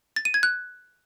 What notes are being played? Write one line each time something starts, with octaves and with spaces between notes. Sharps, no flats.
A6
D#7
G#6
F#6